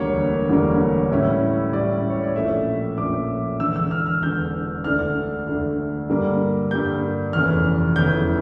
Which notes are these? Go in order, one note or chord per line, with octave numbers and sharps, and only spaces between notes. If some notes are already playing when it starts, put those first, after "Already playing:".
Already playing: E1 D2 D3 G3 A#3 C#5
E1 D2 D3 G3 A#3
A2 G3 C#4 E4
A2 G3 C#4 E4 D5
C#5
D5
A#1 A#2 A3 C#4 E5
A#1 A#2 A3 C#4 D6
E1 E2 D3 E6
E6
F6
F6
E1 E2 D3 G6
D2 D3 A3 D4 F6
D2 D3 A3 D4
G2 D3 G3 A#3
G2 D3 G3 A#3 G6
F1 E2 E3 A3 C#4 F6
F1 E2 E3 A3 C#4 G6